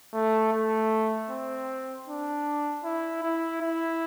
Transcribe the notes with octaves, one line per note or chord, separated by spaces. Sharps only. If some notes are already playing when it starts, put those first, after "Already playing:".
A3
A3
C4
D4
E4
E4
E4